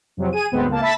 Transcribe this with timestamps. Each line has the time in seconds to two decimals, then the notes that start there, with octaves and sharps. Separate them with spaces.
0.17 F2 C3 F#3
0.33 G#4 D#7
0.52 D2 G#2 B3 C4
0.69 C#2 A#3 A5
0.81 E5 A5 B5 A6 B6